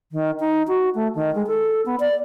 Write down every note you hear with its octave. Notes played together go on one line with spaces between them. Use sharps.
D#3
D#4
F#4
A3
D#3
G#3
A4
B3
D5